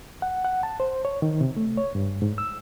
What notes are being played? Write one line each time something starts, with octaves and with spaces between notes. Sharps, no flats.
F#5
F#5
A5
C5
C#5
D#3
C3
A3
C#5
G2
G#2
E6